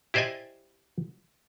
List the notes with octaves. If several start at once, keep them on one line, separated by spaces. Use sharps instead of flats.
E4 G4 C5 D5 D#5 G#5